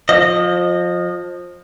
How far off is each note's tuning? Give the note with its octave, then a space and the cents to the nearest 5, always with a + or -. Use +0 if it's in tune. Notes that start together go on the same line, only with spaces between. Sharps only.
F3 +20 D#5 -15